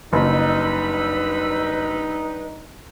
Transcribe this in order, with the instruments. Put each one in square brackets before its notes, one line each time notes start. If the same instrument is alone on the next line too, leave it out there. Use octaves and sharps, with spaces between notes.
[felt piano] F#1 [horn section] G3 D4 D#4 [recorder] B4 [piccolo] E6